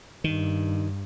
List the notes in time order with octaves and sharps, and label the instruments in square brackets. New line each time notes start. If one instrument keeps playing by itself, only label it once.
[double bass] G2 [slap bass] D#3